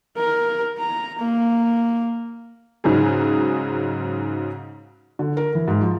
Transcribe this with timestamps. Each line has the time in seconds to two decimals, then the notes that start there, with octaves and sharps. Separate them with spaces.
0.17 A#4
0.79 A#5
1.19 A#3
2.84 G#2 C#3 F#3 D#4 G#4
5.19 D3
5.37 A#4
5.55 E3
5.68 G#2
5.81 F3